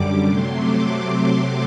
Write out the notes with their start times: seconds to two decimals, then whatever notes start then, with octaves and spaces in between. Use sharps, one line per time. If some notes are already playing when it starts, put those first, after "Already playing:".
Already playing: F#2 D3 G3 D6
0.24 C3 F#3 A3 C6
0.58 D6